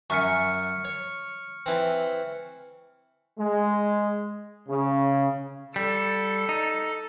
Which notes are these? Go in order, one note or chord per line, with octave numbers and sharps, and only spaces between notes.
F#2 E5 G#5 C#6 F6 C#7
C#5
E3 C4
G#3
C#3
G3 A4
D#4